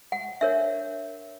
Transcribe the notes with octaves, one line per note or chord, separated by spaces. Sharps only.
F#5
D4 A#4 C#5 E5